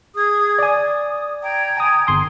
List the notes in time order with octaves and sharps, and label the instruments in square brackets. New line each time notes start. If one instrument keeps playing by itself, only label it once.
[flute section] G#4 D#6 G#6
[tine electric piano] D5 G#5 [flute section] D#6
[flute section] G5 A#5 G#6
[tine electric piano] G#5 D#6
G1 C6 D#6